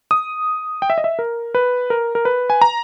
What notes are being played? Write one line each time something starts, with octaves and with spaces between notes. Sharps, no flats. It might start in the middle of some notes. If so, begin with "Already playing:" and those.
D#6
G5
E5
D#5
E5
A#4
B4
A#4
A#4
B4
G#5
A#5